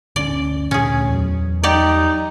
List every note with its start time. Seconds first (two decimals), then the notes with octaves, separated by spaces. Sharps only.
0.16 G1 D2 C#4 D5
0.71 D2 A#2 C#4 G#4
1.08 E2 F#3
1.63 D#4 G4 D5